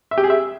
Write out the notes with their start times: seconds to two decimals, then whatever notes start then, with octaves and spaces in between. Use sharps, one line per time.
0.11 E5
0.18 G4
0.24 G#4
0.30 E5